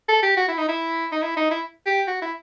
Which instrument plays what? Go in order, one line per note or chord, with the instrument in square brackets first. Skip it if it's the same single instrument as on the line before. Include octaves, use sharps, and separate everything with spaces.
[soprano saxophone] A4
G4
F#4
E4
D#4
E4
D#4
E4
D#4
E4
G4
F#4
E4